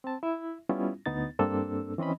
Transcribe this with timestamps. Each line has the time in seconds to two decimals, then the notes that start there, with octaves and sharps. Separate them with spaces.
0.04 C4 A5
0.23 E4 E5
0.69 G3 B3 C#4 E4 F4
1.06 D2 B3 D#4 A6
1.39 G2 A#3 C4 D4 A4 E6
1.98 E3 C4 C#4 D#5 B5